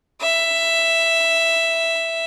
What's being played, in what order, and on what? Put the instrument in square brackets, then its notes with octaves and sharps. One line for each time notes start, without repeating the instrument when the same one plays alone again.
[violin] E5